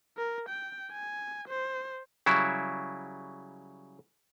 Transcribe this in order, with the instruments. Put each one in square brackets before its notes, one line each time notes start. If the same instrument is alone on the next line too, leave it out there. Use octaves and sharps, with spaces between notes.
[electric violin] A#4
G5
G#5
C5
[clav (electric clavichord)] C#3 F#3 G3 E4